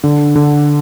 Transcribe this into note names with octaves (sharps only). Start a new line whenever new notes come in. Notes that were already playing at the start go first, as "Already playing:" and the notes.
D3
D3